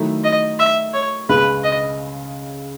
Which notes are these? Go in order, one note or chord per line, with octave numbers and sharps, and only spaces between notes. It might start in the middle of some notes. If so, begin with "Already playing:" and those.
Already playing: D#3 F#3 A3 E4
D#5
E5
C#5
C#2 C#3 G#3 B4
D#5